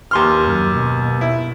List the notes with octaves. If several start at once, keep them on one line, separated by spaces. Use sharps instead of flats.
D#2 C6 F6
F#2
B2
E4